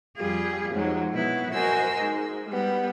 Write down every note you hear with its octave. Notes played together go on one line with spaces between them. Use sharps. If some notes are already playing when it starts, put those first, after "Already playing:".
F2 G3 F4 G#4
F2 G#2 F#3 G#3
B2 F#3 B3 E4
F#4 A#4 C5 D#5 G#5 E6
G#2
G3 B3